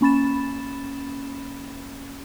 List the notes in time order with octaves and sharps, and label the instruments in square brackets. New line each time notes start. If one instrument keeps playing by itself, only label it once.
[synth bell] A#3 C#4 B5 A6 E7